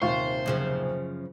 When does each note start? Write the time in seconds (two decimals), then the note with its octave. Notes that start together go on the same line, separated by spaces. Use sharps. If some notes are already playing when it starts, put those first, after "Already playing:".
0.02 D#1 D#2 C3 F4 C5 C#6
0.46 F#2 C#3 F3